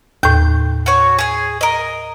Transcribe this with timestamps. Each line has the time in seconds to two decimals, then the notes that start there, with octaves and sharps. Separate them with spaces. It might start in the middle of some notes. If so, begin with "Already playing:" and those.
0.23 D#2 A2 G6
0.86 F#4 C#5
1.19 G#4 G#5
1.61 A#4 D#5